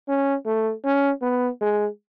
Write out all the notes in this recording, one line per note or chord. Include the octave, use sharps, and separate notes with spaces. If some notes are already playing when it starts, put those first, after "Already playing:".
C#4
A3
C#4
B3
G#3